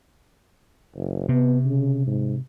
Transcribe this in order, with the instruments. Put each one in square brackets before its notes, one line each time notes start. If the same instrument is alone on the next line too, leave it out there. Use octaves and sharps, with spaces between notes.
[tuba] F#1
[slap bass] C3 [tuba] B3
[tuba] C#3
G#2